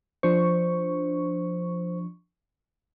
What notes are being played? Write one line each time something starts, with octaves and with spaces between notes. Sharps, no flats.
F3 D4 C5 C#6